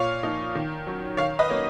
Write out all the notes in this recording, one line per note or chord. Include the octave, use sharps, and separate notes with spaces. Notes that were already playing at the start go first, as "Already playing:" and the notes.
Already playing: A#2 C#5 F5
F3 A#3 D#4
D#3
F#3 C#4
D#3 C#5 F5
B4 D#5
F#3 A#3 C#4